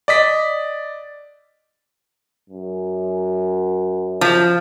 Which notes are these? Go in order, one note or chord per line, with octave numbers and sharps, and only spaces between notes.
D5 D#5 B6
F#2
F3